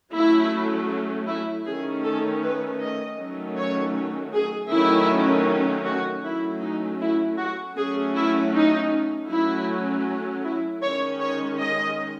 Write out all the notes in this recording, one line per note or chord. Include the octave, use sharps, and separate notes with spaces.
F#3 A3 C#4 E4
E4
D#3 A3 C#4 G#4
A4
B4
D#5
D#3 F#3 A3 C#4
C#5
G#4
D#3 F#3 A3 C#4 E4
F#4
F#3 A3 C#4 E4
D#4
E4
F#4
F#3 A3 C#4 G#4
E4
D#4
F#3 A3 C#4 E4
E4
D#3 G#3 C#4 C#5
C#5
D#5